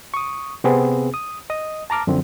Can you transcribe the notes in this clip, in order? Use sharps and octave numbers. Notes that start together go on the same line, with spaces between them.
C#6 D#6
C3 B3 C4 G#4
D#6
D#5 D#6
A5 A#5 D6 F6
F#2 D3 F3 C4